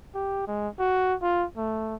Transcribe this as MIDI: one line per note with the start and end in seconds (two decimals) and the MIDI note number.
0.15 0.46 67
0.47 0.68 56
0.79 1.15 66
1.22 1.46 65
1.57 1.95 57